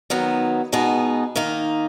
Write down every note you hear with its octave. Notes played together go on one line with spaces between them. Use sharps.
D#3 F#3 B3 D#4
B2 G#3 B3 D#4
D#3 A#3 D#4